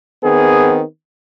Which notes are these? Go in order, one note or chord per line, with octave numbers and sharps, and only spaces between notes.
D#3 B3 C4 G#4